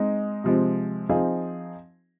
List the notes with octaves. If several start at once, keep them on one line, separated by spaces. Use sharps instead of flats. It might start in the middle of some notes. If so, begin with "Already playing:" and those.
Already playing: G#3 C4 D#4
C3 F3 G#3 C4
F3 C4 D#4 G#4 F5